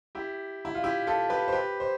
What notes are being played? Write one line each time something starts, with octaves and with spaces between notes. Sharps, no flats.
E4 G4
E4
F4
E4 G4
F4 A4
G4 B4
C5
G4 B4
C5